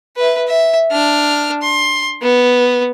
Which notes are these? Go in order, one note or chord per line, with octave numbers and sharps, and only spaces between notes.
B4 E5
E5
D4 F6
C6
B3